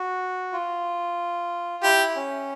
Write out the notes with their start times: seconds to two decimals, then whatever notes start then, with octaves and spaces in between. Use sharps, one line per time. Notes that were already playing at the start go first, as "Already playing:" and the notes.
Already playing: F#4
0.53 F4
1.83 E4 G4
2.16 C#4